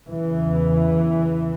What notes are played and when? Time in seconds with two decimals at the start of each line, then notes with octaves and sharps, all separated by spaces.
0.10 E2 C#3 E3